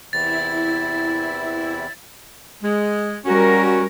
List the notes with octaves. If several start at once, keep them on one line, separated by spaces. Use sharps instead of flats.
E2 C3 E3 E4 A6
G#3
G3 C#4 F#4 A#4